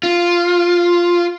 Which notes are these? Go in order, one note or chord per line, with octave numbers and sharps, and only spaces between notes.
F4